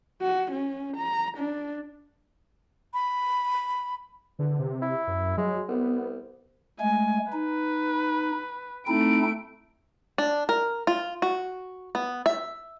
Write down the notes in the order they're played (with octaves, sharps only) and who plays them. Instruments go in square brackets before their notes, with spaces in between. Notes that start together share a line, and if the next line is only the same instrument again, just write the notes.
[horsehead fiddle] F#4
C#4
A#5
D4
[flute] B5
[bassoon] E2 [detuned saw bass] D3
[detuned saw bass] C3
[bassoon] E4
[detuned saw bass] F#2
[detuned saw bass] F#3 [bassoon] G#3
[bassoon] C2 [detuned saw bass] B3
[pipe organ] G#3 A3 [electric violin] G#5
[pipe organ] D#4 [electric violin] B4
[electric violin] A3 D7 [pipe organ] C4 D#4 E4
[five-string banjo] D4
A#4
F4
F#4
B3
E5